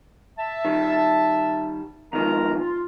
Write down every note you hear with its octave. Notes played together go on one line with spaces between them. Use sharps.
E5 A5
D#3 G3
E2 D#3 F3 G#3 A#4 A#5
F4